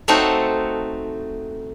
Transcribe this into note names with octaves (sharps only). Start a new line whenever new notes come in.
A3 C4 D#4 F#4 A4